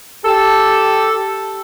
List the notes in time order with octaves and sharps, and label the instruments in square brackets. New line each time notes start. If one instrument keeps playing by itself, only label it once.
[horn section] G4 A4